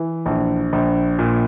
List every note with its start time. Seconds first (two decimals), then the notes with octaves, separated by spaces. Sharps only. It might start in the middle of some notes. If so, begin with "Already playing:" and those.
Already playing: E3
0.26 A#1
0.73 A#1
1.19 A#2